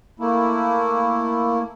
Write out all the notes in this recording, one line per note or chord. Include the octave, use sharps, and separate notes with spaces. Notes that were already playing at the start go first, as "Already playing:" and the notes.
A3 A#3 E4